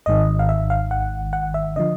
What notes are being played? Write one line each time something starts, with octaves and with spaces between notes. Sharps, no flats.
G#1 G#2 D#3 D#5
F5
E5
F5
F#5
F#5
E5
D3 F3 D#5